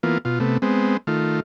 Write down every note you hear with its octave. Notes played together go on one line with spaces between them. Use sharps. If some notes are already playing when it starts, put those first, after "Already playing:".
E3 A#3 B3 F4
B2 F4
C3 A3 B3
G#3 B3 C4
D#3 A3 F4